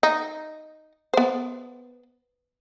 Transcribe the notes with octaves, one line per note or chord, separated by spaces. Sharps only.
D#4
B3 C5